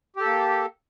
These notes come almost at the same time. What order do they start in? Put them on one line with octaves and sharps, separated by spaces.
G4 A4 A#3